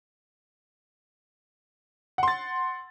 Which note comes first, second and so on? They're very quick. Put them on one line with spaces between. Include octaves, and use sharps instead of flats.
F#5 C6 A6